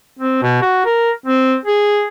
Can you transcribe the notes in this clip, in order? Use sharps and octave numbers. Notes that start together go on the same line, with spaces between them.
C4
B2
F#4
A#4
C4
G#4